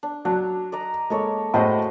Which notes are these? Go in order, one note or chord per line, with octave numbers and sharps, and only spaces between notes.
D4
F#3 D4
D5 D#5 A#5
G#3 A#3 A4 C#5
A2 F#4 G#4 C5 D#5